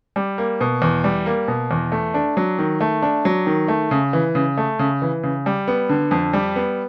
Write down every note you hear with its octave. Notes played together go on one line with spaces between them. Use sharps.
G3
A#3
B2
E2
G3
A#3
B2
E2
A3
D4
F#3
D#3
A3
D4
F#3
D#3
A3
C#3
E3
C#3
A3
C#3
E3
C#3
G3
B3
D3
F2
G3
B3